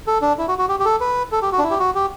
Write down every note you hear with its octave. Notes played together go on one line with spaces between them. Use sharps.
A4
D4
E4
F#4
F#4
G4
G4
A4
B4
A4
G4
F#4
D4
E4
G4
F#4
G4